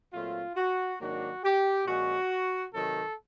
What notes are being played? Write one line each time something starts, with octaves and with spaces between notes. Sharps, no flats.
A#2 F#3 A3 C4 F4
F#4
G#2 D#3 F#3 A#3 D4 F#4
G4
A#2 F3 G#3 C#4 F#4
C3 D#3 F#3 A4